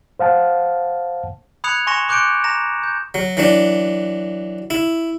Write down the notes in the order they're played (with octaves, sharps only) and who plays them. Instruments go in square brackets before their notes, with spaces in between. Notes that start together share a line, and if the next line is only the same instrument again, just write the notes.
[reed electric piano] C5 F5 F#5 A5
[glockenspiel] B5 D#6 F#6 G#6 C#7 F7
G#5 C6 C#6 A#6 C#7 E7
C6 D6 F#6 G6 C#7 D7
A#5 A#6 E7
G6
[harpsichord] F#3
E3 F#3 D4
E4